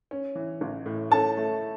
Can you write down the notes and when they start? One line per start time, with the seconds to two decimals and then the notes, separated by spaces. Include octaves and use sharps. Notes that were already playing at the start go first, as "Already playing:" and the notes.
0.11 C#4
0.35 E3
0.61 A1
0.86 A2
1.11 C#4 A4 A5
1.37 A3